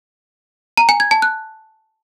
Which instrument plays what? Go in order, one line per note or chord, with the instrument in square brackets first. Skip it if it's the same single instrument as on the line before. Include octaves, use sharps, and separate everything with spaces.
[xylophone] A#5
G#5
G#6
A5
F#6